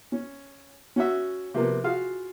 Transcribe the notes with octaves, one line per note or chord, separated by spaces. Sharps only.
C#4
C#4 F#4 E5
C3 F3 A#3 B3
F4 F#4 G#4 F5